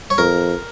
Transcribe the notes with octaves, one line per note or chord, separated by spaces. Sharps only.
C#5
F2 A#4